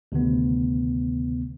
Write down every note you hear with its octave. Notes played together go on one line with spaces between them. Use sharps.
D2 C3 D#3 B3